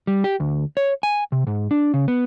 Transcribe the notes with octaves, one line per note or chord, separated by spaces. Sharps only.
G3
G4
D2
C#5
G#5
C3
G#2
D4
C#3
B3